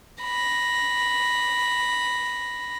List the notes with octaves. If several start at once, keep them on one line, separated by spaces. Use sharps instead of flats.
B5 A#6